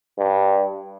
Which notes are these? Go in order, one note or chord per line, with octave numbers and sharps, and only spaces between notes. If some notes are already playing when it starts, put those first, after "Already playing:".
G2